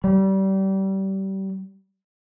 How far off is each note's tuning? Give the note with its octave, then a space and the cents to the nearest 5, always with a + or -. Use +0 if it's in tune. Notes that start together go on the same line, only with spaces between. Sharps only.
G3 -25